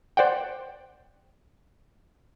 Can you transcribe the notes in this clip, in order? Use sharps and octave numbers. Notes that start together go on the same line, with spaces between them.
C5 D5 F#5 G5